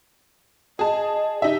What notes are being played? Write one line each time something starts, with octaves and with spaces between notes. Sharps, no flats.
G#4 D#5 A5
D#4 G4 E5